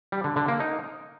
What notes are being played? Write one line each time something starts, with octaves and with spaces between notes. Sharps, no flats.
G3
D3
D3
A#3
D#4